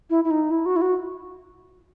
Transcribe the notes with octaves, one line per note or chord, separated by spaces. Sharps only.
E4
E4
D#4
E4
F#4
E4
F#4